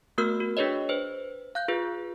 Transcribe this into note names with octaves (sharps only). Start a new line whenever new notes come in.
A3 B3 F#4 A#4 E6 F6
F#4
D4 G#4 B4 C#5 D#5
B4 C5
F5 F#6 G6
F4 G#4 B4